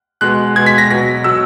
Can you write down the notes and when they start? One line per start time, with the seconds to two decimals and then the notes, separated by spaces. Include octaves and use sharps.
0.21 B2 G#3 F#6
0.56 B2 G#3 G#6
0.66 B6
0.78 A#6
0.90 B2 F#3 A#6
1.24 B2 F#3 E6